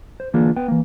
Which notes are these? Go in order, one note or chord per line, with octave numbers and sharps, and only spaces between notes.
C5
D3 E3 A#3 D4 F4 G#4
B3 G5
E3 A#3